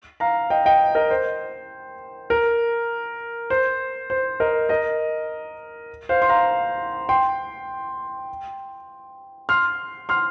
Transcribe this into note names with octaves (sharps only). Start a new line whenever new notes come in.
F5 A#5
D#5 G5
D#5 G5
A#4 D#5
C5
A#4
C5
C5
A#4 D#5
A#4 D#5
C5 F5
C6
F5 A#5
G5 C6
C6 F6
C6 F6